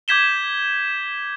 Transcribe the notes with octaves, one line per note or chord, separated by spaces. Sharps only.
D6 G6 G#6 B6 E7 G7